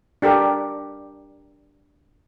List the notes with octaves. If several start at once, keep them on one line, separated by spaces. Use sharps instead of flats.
D4 G4 A4 A#4